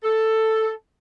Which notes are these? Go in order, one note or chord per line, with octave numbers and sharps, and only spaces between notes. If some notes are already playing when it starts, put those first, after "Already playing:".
A4